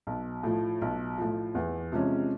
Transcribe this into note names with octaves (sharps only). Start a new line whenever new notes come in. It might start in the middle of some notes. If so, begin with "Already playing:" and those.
B1
A2 F3
B1
A2 F3
E2
C3 F3 G#3 C#4